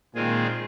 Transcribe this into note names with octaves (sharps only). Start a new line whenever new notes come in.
A#2 D#3 G#3 C4 F4 G#4